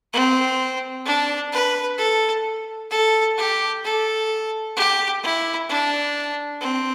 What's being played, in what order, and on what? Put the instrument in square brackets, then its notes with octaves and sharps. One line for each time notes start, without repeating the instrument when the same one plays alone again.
[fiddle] C4
D4
B4
A4
A4
G4
A4
G4
E4
D4
C4